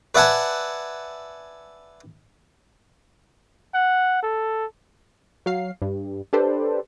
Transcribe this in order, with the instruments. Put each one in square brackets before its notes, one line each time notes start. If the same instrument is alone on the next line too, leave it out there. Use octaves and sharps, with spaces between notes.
[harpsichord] B4 D5 E5 F#5 G#5 A5
[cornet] F#5
A4
[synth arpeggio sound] F#3 F5 C7
G2
D4 G4 A4 B4 C5 D5